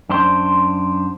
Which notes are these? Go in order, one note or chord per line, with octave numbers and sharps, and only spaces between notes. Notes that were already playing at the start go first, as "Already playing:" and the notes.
F#2 D4 C5 C6